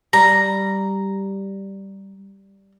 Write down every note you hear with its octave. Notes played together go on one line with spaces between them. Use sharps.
G3 A#5